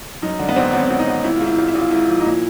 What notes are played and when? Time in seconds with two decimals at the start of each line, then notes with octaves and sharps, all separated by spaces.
0.22 F#2 D#4
0.39 D3 D4
0.49 B3
0.56 G#1 C4
0.73 G#1 C#4
0.90 G#1
0.99 D#4
1.07 G#1
1.24 G#1 E4
1.36 G#2 F4
1.46 E4
1.57 G#1 F4
1.68 E4
1.75 G#1 F4
1.91 G#2 E4
2.08 F3
2.20 D#4
2.25 A#2 E4